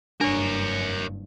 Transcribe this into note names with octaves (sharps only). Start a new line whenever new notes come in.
F#1 G2 D4 A#4 C#5